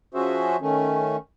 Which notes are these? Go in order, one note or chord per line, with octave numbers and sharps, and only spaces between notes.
F3 C#4 F#4 G#4 C5 E5
D#3 A3 C#4